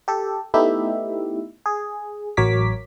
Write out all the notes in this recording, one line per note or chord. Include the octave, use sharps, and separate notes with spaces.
G4 A4
A3 B3 D#4 E4 G4 E5
G#4
A1 F#3 A#4 C#5 D6 B6